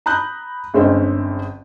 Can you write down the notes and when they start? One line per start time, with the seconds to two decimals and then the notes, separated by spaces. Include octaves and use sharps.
0.06 A#5 B5 D#6 F#6 G6
0.74 G1 G#3 C4 C#4 D#5 E5